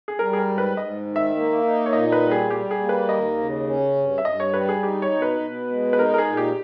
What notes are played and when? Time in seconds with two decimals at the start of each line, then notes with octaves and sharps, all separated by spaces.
0.08 G#4
0.19 G3 A#4
0.33 G#4
0.39 A#4
0.48 G#2
0.58 B4
0.77 G#2 D#5
1.06 D#3
1.16 E5
1.35 A#3
1.64 D#4
1.86 C#5
1.93 A#2 D#5
2.12 B4
2.22 G3
2.31 G#4
2.51 G3 G4
2.71 G#4
2.80 A#3
2.89 B4
3.09 D#2 D#5
3.38 C#3
3.67 C#4
3.96 G2
4.18 E5
4.25 G2 D#5
4.40 C#5
4.54 G3 B4
4.69 G#4
4.83 D#4 G4
5.02 C#5
5.12 B2
5.22 B4
5.41 B2
5.70 G#3
5.93 B4
5.99 D#4 A#4
6.14 A#4
6.18 G#4
6.28 A#2
6.37 G4